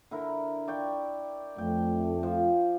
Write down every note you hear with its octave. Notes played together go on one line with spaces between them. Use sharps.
D3 E4 A#4
D5 G5 C#6
F2 A3 G5
F3